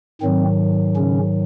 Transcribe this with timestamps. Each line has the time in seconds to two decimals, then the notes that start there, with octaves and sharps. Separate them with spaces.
0.21 G#2 D#3 F#3 C4
0.96 C#3 C#4